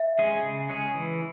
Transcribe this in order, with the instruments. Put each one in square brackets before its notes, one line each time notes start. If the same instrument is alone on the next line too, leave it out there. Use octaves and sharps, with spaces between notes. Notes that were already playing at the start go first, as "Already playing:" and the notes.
Already playing: [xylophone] E5
[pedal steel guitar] G#3 C#4 G#4
C#3
G#3 C#4 G#4
E3